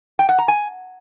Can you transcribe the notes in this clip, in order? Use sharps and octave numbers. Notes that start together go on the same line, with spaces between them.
G5
F#5
A#5
G#5